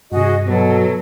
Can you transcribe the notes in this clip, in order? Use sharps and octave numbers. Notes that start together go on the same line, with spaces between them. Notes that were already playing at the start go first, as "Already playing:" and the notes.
G2 C3 F#4 G#4 D#5
B2 F#3 A4